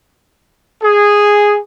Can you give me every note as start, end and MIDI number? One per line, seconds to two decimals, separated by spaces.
0.83 1.58 68